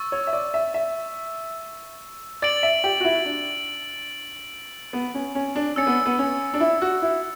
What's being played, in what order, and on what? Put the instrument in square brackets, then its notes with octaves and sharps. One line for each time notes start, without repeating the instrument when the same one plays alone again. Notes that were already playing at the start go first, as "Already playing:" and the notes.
Already playing: [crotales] C#6 E6 A6
[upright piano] C#5
E5
D5
E5
E5
[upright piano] D5 [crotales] A6 D7 F#7
[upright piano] E5
G4
F#4
E4
D4
B3
C#4
C#4
D4
[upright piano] C#4 [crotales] E6 A6 C#7
[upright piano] B3
B3
C#4
D4
E4
F#4
E4